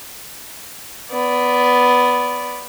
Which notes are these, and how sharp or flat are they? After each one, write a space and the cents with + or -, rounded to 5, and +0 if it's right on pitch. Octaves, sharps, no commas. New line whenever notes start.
B3 +5 D5 -15